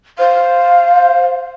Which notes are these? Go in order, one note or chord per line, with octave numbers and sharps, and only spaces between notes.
C5 F5